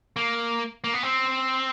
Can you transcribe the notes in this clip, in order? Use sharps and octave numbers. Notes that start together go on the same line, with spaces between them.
A#3
A#3
B3
C4